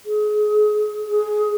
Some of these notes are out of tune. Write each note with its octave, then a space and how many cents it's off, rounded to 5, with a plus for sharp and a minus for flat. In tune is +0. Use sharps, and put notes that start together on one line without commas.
G#4 +30
G#4 +10